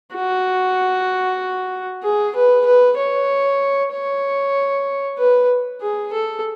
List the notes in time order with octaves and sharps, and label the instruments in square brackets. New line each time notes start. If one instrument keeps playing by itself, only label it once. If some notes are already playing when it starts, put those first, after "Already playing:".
[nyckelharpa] F#4
G#4
B4
B4
C#5
C#5
B4
G#4
A4